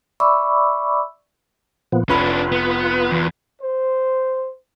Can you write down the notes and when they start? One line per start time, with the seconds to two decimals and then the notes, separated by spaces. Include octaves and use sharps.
0.20 D5 E5 B5 C#6 D6 E6
1.92 A#2 F3 B3
2.09 F1 C#4 D4 F4 B4 B5
2.52 B3
3.11 E2
3.61 C5